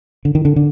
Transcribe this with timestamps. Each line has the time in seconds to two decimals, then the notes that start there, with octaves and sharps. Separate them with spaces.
0.25 D3
0.35 D#3
0.45 D3
0.56 D3